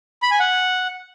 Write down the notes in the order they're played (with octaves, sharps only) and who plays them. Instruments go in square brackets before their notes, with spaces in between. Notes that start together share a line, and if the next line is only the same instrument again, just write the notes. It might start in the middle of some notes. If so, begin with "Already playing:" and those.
[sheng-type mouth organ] B5
G#5
F#5